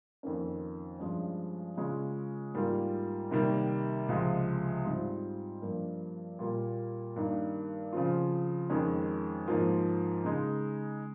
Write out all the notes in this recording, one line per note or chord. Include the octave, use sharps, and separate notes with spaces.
F2 D#3 A#3 C#4
G2 F3 G#3 C#4
C#3 G#3 C#4 F4
G#2 G3 A#3 F4
C3 D#3 G3 A#3
C#2 C3 F3 G#3
G#2 G3 C4 F4
G2 F3 A#3
A#2 G3 A#3 F4
G2 D#3 A#3 D#4
C#3 F3 C4 F4
F2 D#3 G#3 C#4
G#2 F3 A#3 F4
C#3 G#3 D#4